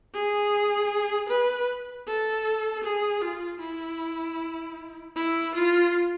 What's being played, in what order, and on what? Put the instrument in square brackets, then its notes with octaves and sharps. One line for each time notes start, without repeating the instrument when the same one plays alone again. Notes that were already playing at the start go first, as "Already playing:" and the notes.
[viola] G#4
B4
A4
G#4
F4
E4
E4
F4